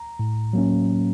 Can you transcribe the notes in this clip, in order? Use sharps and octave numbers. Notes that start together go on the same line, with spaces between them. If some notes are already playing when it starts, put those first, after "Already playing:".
Already playing: A#5
A2
F#3 A#3 C#4